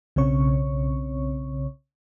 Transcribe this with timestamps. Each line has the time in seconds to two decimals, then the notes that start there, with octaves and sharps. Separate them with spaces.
0.16 B1 C#3 C4 C#5 C#6